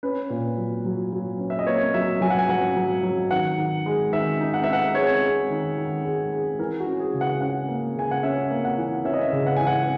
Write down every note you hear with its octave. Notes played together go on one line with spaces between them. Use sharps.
C#4 B4
A#2
F#3
F#3
F#3
C#4
E5
D#5
A#3 C#5
F#3 E5
F#3 G#5
F#5
G#5
F#3 F#5
F#3
F#3
D#3 F#5
D#3
G#3
D#3 E5
D#4
F#5
D#4 E5
F#5
G#3 C#5
G#3
D#3
D#3
G#3
G#3
E3 A#4
F#4
C#4
G#4
C#3
F#5
C#4 F#5
A#3
C#3 G#5
F#5
C#4 E5
A#3
F#5
E3
C#4 E5
D#5
E5
C#3
F#5
E3 G#5
F#5